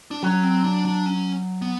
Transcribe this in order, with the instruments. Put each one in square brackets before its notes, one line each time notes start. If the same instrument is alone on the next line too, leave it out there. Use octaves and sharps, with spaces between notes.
[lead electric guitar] D4
[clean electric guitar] F#3 [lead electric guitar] C#4
[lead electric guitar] C4
D4
D4
C#4
B3